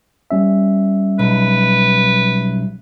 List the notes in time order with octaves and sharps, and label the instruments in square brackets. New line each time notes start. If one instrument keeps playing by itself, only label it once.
[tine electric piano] G3 C#4 E5
[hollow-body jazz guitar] B1 [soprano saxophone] B4